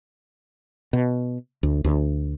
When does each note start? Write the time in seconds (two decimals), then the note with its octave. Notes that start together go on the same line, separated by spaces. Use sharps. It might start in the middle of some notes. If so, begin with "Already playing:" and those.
0.93 B2
1.63 D2
1.84 D2